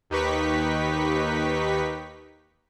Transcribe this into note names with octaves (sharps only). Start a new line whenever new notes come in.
D#2 D#4 G4 B4 C#6 B6